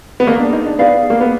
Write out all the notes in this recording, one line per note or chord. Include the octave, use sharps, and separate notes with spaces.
B3
A#3 G#4 D#5 A#5
D4
D#4
D4
B3 G#4 D5 F5
A#3
B3